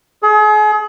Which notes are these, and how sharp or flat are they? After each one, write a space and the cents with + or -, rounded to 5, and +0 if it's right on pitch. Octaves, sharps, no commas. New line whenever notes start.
G#4 +35